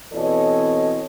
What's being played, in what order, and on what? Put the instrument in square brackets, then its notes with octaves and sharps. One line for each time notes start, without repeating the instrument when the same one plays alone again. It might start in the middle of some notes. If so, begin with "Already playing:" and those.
[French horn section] B2 E3 C4 A4 C#5 D#5